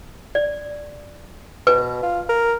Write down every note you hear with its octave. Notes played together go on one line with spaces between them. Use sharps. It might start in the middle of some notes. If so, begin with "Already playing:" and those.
D5
B2 B4
F4
A#4